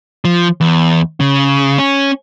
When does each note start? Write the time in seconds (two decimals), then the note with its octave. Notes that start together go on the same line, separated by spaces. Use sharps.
0.25 F3
0.61 E2
1.20 C#3
1.78 C#4